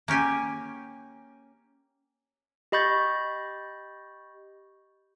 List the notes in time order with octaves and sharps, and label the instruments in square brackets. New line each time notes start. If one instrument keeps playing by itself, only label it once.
[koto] A#3 C#4 G4 G#5
[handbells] G4 D#5 B5 C#6 G6 A6